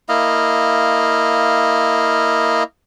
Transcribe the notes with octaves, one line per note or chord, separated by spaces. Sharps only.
A#3 E4 D#5 F5